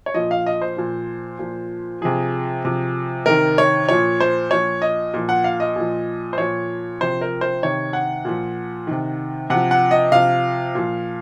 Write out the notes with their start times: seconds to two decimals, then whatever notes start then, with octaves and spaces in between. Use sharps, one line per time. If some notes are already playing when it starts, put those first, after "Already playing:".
0.06 C#5
0.14 A#2 F3 D#5
0.31 F5
0.46 D#5
0.62 C5
0.77 A#2 F3
1.39 A#2 F3
2.02 C3 F3 G#4
2.65 C3 F3
3.26 C3 D#3 A#4
3.58 C#5
3.89 A#2 F3 C#5
4.20 C5
4.51 A#2 F3 C#5
4.82 D#5
5.14 A#2 F3
5.29 F#5
5.44 F5
5.60 D#5
5.76 A#2 F3
6.33 C5
6.38 A#2 F3 C#5
7.01 C3 F3 C5
7.21 A#4
7.41 C5
7.63 C3 D#3 C#5
7.93 F#5
8.25 A#2 F3
8.87 C3 D#3
9.50 C3 F3 F#5
9.71 F#5
9.91 D#5
10.12 C3 F3 F5
10.75 A#2 F3